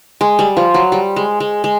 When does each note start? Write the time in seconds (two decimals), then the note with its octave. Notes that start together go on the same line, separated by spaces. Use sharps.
0.21 G#3
0.39 G3
0.57 F3
0.74 F#3
0.92 G3
1.16 G#3
1.40 G#3
1.64 G#3